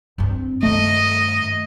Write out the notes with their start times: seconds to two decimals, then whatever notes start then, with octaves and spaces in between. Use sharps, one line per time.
0.18 G2 C4
0.63 G2 D#3 A3 D#5